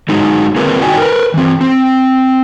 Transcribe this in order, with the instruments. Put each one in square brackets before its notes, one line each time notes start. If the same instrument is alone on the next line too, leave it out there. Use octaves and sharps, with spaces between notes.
[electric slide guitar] F#3 G#3 D#4 G#4
A#3 C4 F4 G#4 A#4 B4
D#4 F#4 D5 G5 G#5
A#4 B4
E3 C4
C4